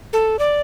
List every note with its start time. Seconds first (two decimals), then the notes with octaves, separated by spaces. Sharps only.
0.13 A4
0.39 D5